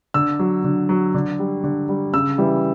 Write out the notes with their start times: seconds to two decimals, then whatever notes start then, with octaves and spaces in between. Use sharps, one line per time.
0.14 D3 E6
0.39 F#3
0.64 D3
0.89 F#3
1.15 D3
1.39 G3
1.64 D3
1.89 G3
2.14 C#3 E6
2.38 E3 G3